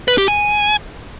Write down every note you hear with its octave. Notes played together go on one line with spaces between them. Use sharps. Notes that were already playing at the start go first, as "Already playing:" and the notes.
B4
G4
G#5